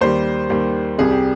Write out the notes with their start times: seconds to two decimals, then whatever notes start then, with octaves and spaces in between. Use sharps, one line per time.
0.01 D#2 D#3 G3 C5
0.50 D#2 D#3 G3
0.98 C2 C3 G3 G#4
1.11 G4